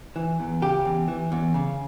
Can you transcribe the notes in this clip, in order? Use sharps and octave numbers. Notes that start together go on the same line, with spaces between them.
E3
E2
C#3 G4
E2
E3
E2
C#3